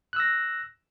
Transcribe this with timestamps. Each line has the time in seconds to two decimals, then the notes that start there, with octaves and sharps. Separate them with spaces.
0.13 F#6
0.16 E6
0.20 A#6